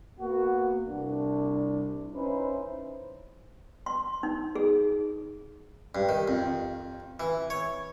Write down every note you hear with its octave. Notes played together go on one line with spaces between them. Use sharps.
A#3 B3 F#4
C2 D4
C#4 D#4 E4 B4 C5
C6
D#4
G#4
G2
D#3
F2
E3
C#5